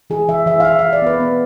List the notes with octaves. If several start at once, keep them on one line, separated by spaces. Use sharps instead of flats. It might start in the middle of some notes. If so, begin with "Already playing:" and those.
E3 G#4
E3 E5
E3 E5
F5
E3 E5
F5
E3
D5
B3 B4
B3